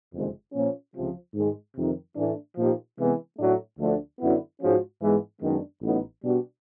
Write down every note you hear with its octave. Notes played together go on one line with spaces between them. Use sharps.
F#1 F2 C3 D#3 G#3
A#2 F3 A#3 C#4
C#2 C3 F3
G#2 D#3 G#3
F2 C3 D#3
A2 E3 A3 D4
A#2 F3 A#3 D#4 G4
C3 E3 G#3 B3
A2 F#3 A3 D4 F#4
D2 D3 F3 A3 D4
F#2 D3 F#3 B3 E4
G#2 F3 G#3 C#4 F#4
G#2 E3 G#3 B3
F#2 D#3 G#3 B3 D4
A1 A2 F#3 B3 D#4
B2 G3 B3 D4 F#4